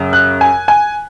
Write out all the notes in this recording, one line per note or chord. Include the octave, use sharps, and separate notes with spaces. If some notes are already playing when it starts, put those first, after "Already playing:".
Already playing: F#2 C#3
F#6
G#5
G#5